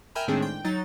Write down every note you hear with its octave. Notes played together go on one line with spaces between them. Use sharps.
A#4 E5 G5 G#5 A#5 B5
A2 D#3 G#3 C4 D4 G#4
G5
F#3 D#4 A6